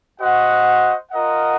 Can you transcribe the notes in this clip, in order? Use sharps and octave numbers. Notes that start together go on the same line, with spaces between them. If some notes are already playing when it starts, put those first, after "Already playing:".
F#4 C5 D#5 F#5
F4 A#4 D#5 F#5